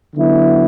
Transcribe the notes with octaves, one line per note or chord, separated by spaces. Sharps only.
D3 F#3 B3 E4